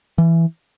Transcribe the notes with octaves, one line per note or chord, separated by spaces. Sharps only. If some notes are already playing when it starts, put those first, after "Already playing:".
E3